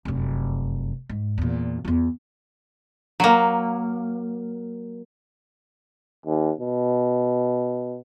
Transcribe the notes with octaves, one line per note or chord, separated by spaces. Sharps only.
F1 F#2
G#2
E2 A#2
E2 F4
F#3 A#3
D#2
B2